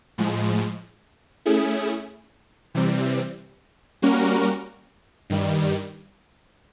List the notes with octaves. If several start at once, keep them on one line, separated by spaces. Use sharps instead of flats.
A2 F3 G#3
A3 C#4 E4 G#4
C3 E3 G3 C4
G3 A#3 C#4 F#4 A#4
G2 D#3 G3